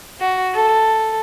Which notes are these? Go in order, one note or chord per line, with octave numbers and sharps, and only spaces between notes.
F#4
A4